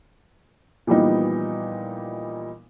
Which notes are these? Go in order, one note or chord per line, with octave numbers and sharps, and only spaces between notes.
A#2 E3 F3 G3 B3 D#4